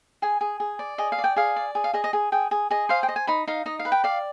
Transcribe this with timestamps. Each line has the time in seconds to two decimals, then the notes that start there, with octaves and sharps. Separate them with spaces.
0.22 G#4 G#5
0.41 G#4
0.60 G#4
0.79 D5
0.98 G#4 D#5
1.12 F5
1.18 D5
1.24 G5
1.36 G#4 F5
1.56 D5
1.75 G#4
1.84 F5
1.94 G#4 D#5
2.04 D#5
2.13 G#4
2.32 G#4 G5
2.51 G#4
2.71 G#4 D#5
2.89 C5 F5
3.03 G5
3.09 D#5
3.16 G#5
3.27 D#4 B5
3.48 D#4 F5
3.66 D#4 D#5
3.79 F5
3.85 B4
3.92 G5
4.04 D5 F5